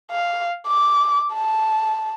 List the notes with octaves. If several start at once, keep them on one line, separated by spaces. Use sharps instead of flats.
F5
D6
A5